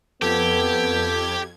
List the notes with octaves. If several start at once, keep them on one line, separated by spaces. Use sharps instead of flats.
F2 B3 G4 A4 G#6